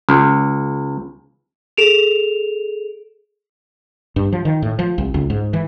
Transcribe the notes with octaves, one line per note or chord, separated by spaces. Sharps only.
C#2
G#4 A4 D7 E7 F7
G2
F3
D#3
A2
F3
C2
C#2
G#2
E3